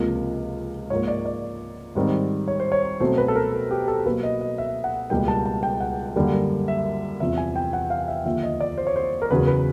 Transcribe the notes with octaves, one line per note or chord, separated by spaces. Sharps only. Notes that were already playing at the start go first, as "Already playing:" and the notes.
Already playing: C#2 C3 F3 A#3
G#2 F3 A#3 C#5
D5
D5
G#2 D#3 G3 C4
C#5
C5
C#5
B2 F#3 A3 C4 C5
B4
A4
A#4
A4
G4
A4
B2 F#3 A#3 B4
D#5
D#5
E5
F#5
C#2 B2 G3 A#3 G5
A5
A5
G5
F#5
F#2 D3 G3 A#3
E5
E2 C3 F3 E5
G#5
G5
F#5
F5
E5
D#2 D3 F3 E5
D#5
D5
C5
C#5
C5
A#4
E2 C#3 F#3 B4
B4